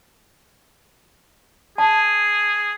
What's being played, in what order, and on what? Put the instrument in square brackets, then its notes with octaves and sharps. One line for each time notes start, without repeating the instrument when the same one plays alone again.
[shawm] G#4 [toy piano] A5